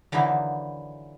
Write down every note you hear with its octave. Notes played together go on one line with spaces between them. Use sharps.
D3 E3 F#3 A#3 D#4 E4